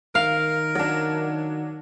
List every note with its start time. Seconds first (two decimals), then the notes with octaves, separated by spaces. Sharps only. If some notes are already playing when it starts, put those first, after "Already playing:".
0.15 D#3 A#4 F5
0.75 F#3 D4